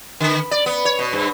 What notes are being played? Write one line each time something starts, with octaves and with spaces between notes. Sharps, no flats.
D3
D5
B3
C#5
B2
G2